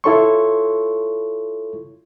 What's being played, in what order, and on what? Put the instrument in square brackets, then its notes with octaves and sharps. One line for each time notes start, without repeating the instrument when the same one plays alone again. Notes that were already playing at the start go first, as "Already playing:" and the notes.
[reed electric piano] E4 F4 A4 C#5 C6 C#6